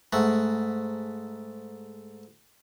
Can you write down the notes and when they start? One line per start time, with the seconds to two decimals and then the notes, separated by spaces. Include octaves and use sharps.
0.13 G#2 A3 F#5